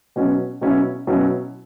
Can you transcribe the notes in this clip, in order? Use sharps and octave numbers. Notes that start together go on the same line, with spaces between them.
B2 F#3 C#4 E4
B2 F#3 C#4 E4
B2 F#3 C#4 E4